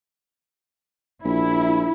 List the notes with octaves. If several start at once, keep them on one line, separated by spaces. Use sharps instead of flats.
A#1 E4